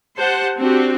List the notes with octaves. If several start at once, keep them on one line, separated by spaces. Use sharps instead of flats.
G4 C5 F#5 A5
C4 D4 F#4 G4